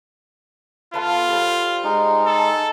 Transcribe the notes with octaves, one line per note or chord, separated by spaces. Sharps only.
B3 F4 A4 F5
G3 C5
G#3 D#4
A4 A5